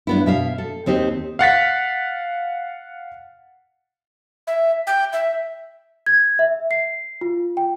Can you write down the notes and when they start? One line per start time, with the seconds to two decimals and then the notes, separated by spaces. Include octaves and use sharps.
0.07 G2 B3 E4
0.26 B2 E5 F5
0.58 A4
0.86 D#2 C4 D#4 G4
1.39 F5 F#5 A6 B6
4.47 E5
4.87 G5
5.13 E5
6.06 G#6
6.39 E5
6.71 C7
7.21 F4
7.57 G5